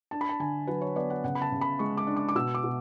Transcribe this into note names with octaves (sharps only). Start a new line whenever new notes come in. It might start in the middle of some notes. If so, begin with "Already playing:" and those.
D4 A5
B5
A5
D3 G#5
F#3 B4
C#5
B3 D5
F#5
C#3 F#5
B5
A5
C#3
B5
G#3 C#6
D6
D4
D6
D6
B2 E6
D6
B2